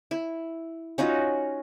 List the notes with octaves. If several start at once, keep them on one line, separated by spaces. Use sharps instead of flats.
E4
C#4 D#4 F4 F#4